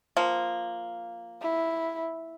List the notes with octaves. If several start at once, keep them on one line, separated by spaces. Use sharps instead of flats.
F3 A#3
E4